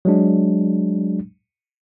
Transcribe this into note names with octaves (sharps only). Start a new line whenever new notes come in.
F#3 G#3 D4